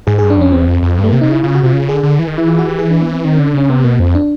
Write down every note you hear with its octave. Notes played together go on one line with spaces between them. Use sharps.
G#2 G#4
G2 G#4
D4
F2 C#4
E2 C4
F2
F2
G2
A3
C3 A#3
C3 D#4
C#3 E4
C#3 F4
F#4
C3 F4
C#3
D3 G#4
D3
E3
D#3
E3 E4
F4
F#4
G4
G#4
D4
B3
C4
D#3 C4
D3 C#4
D4
C#3 C#4
C3 B3
B2 A#3
F2 C4
D4